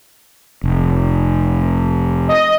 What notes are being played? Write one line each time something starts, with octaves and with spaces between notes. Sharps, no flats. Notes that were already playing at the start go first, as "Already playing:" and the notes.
F1
D#5